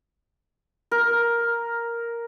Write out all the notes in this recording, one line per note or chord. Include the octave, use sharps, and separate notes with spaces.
A#4